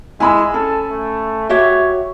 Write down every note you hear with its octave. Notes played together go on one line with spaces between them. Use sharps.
G#3 E4 G#5 B5 E6
C#4 A4
A3
F#4 G4 C#5 E5